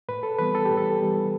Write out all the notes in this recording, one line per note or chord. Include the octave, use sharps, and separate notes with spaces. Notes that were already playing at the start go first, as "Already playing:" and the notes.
A2 B4
A4
E3 G3 B3 B4
A4
A2 G4
A4
E3 G3 B3